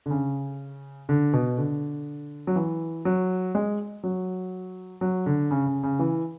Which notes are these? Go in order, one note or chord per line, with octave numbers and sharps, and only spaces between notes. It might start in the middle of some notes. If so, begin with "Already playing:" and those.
D3
C#3
D3
B2
D3
F#3
E3
F#3
G#3
F#3
F#3
D3
C#3
C#3
C#3
E3